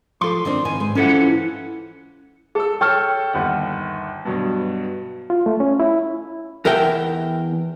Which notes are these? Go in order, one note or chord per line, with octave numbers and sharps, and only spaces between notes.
F3 A4 C6
D#3 C4 D4
D#3 B4 G#5
G#2
E3 F3 C#4 E4 A4 F#5
G#4 A4 E6
A4 C#5 G5 C#6 F6 G6
G1 D#2 F#5
G2 B2 F#3
F4
A3
C#4
E4
E2 A#4 E5 G5